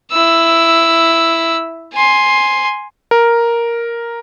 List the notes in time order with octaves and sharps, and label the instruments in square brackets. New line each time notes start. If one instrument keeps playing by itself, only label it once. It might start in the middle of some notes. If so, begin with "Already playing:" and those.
[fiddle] E4 E6
G#5 C6
[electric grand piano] A#4